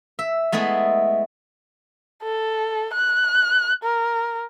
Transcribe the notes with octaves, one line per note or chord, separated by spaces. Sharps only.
E5
G#3 A3 B3 E4 G#4
A4
F#6
A#4